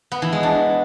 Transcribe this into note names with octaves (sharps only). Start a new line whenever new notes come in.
B3
E3
G#3
D4